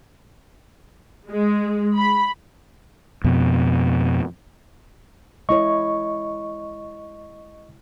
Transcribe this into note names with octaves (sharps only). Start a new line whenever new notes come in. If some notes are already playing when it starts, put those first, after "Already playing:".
G#3
B5
F2 B2
G#3 E4 C#5 D#5 C#6